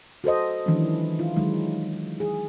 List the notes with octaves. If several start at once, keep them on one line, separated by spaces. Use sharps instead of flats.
F#4 A4 C5 D#5
D#3 E3 F#3 G#3 C#4 D4
E4 F4
D#3 F#3 G#3 D#4
G#4